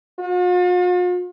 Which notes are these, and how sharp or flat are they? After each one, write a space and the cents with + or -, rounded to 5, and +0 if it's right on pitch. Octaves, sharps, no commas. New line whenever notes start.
F4 +45